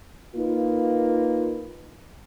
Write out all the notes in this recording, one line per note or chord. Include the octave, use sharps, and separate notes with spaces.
A#3 D#4 F4 A#4 B4